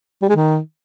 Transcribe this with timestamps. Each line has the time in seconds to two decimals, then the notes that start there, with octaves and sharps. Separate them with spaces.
0.22 G3
0.29 G#3
0.36 D#3